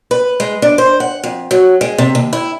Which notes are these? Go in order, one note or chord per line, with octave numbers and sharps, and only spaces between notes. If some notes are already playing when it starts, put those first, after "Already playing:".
B4
G#3
D4
C5
F#5
F2
F#3
G#3
C3
D#2
E4